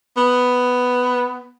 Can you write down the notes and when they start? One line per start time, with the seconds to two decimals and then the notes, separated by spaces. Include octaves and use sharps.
0.17 B3